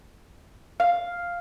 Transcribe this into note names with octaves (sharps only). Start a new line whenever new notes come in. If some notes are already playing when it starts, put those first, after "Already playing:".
F5